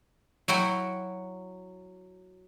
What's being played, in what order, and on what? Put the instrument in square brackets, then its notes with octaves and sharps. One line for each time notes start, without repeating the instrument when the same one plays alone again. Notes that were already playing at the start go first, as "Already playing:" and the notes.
[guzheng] F#3 E4 F#4 G5